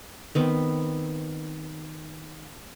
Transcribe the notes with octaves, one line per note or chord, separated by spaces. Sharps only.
D#3 B3 C4